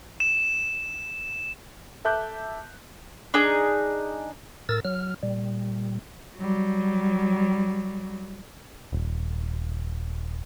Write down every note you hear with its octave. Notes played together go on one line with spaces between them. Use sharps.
E7
A4 E5 A5 D6 F#6 G6
D4 D#4 G#4
A2 A#4 E6 A6
F#3 F6
A#2 G3
F#3 G3
D#1